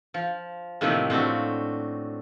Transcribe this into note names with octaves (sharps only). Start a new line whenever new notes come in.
F3
A2 C3 D#3 F3 A#3
A2 C4 D4 F#4